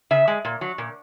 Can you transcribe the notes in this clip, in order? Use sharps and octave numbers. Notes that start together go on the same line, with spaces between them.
C#3 E5
G#3
A#2
F#3
A#2